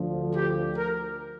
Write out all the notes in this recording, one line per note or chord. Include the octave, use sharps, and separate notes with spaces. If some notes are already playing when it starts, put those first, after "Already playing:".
Already playing: D2 D3 F3
G4
A#4